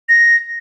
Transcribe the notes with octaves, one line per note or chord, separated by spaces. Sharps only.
A#6